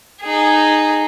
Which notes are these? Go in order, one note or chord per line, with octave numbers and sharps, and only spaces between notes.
D#4 G#4